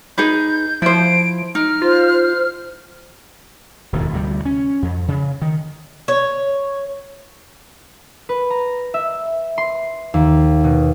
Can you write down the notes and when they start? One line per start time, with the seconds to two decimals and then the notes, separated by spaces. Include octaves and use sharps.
0.18 D#4 G#4 B4 G6
0.82 F3 E4 C5 D7
1.55 D#4 F6
1.82 F4 C5
3.93 E1 D#2 A2
4.13 D2 C3 G3
4.45 C#4
4.82 F2
5.08 C#3
5.42 D#3
6.08 C#5
8.29 B4
8.50 A#5
8.94 E5
9.58 C6
10.14 D#2
10.64 B2